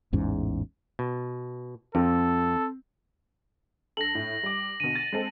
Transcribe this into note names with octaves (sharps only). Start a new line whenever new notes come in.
A1 E2 G#2 C#4
B2
F2 C4 A4
G2 A4 A#6 F#7
A2
G3 D6
D2 B2 D#7
A6
G#3 C4 A4